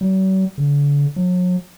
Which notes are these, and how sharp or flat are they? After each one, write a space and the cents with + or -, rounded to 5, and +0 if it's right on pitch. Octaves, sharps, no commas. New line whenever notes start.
F#3 +45
D3 -40
F#3 -40